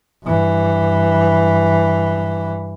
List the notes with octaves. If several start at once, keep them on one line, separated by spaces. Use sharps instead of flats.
G2 E3